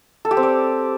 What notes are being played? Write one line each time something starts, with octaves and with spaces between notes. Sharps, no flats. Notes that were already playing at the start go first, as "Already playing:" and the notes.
A4
G4
C4
D5